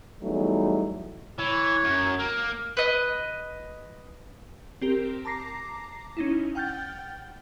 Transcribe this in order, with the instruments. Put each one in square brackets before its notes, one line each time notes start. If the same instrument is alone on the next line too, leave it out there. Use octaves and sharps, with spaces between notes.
[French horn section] E2 F#3 G3 A3 D#4
[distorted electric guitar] E3 [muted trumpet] C#5
[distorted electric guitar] F#2
A#3
[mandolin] B4 D#5
[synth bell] C4 G4 A#4
A5 A#5 D6 A#6 C7
C#4 D#4 E4
F#5 G5 F6 G6 A6